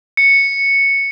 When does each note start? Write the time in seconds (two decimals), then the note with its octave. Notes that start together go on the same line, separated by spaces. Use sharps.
0.17 C#7